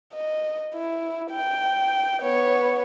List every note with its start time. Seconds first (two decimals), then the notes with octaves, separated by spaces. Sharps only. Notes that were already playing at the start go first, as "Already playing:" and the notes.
0.14 D#5
0.74 E4
1.31 G5
2.21 B3 C#5